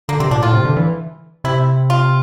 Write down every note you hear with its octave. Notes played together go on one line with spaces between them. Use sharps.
D3 A#3
C3 C4
A#2 D4
A2 F4
C3
D3
E3
C3 E4
F4